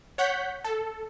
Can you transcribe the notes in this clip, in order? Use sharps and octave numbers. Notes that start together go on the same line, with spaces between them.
C#5 F#5 G6 B6
A4